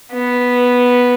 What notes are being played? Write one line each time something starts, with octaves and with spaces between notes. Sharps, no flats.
B3